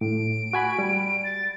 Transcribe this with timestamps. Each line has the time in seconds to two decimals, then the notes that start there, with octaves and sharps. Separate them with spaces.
0.01 A2 D7
0.53 F#4 G#5 B5
0.79 G3
1.24 A6